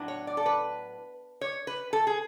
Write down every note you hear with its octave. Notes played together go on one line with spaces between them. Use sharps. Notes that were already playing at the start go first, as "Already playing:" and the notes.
Already playing: A2 F#3 B3 D4
C#5
D5
A4
B4
C#5
B4
A4
G#4